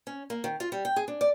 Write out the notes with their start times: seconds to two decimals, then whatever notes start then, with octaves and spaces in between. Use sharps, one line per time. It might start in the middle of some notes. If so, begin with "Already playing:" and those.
0.07 C#4
0.30 A#3
0.44 D#3
0.60 F4
0.72 G3
0.85 G5
0.96 G#4
1.08 D4
1.21 D5